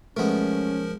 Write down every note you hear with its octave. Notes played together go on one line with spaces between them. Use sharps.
B1 F3 G#3 A3 B3 C#4 A#4